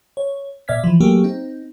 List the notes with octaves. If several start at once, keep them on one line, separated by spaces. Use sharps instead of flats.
C#5
A#2 D5 E5 F6 G#6 B6
E3 F3
F#3 A3 A#3 G4 G#4
C4 D#4